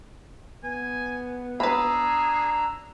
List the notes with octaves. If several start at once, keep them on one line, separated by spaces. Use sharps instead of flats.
B3 G#5
D4 G#4 B4 A#5 B5 E6